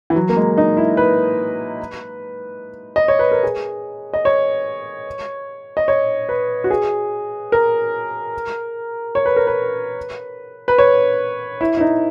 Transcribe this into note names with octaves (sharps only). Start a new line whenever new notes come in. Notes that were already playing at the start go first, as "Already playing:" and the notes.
E3
F#3
A#3
G#3
D#4
E4
B4
D#5
C#5
B4
A#4
G#4
D#5
C#5
D#5
C#5
B4
F#4
G#4
A#4
C#5
B4
A#4
B4
B4
C#5
E4
E4
D#4